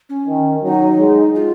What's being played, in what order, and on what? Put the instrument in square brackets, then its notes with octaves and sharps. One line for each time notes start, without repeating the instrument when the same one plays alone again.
[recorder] C#4
[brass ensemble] D#3
[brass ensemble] F#3 [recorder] D#4
[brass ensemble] G#3
[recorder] F4